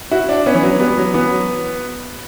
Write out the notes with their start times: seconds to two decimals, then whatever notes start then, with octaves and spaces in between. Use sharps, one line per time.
0.11 E4 F#4
0.29 D4
0.46 B3 C#4
0.55 E3
0.63 F#3
0.80 G3 B3
0.97 F#3
1.14 E3 B3
1.31 F#3